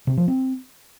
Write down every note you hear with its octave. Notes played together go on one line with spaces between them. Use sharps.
C3
F3
C4